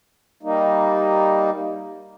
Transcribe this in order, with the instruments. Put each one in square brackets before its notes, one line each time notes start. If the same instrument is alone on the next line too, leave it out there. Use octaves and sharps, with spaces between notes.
[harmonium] G3 A#3 D#4